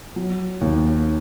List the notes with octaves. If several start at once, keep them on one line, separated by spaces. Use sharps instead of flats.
F#3
D#2